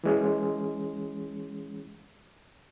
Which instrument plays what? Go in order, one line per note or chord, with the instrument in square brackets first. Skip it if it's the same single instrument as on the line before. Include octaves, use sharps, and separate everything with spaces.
[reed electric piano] E3 G#3 C#4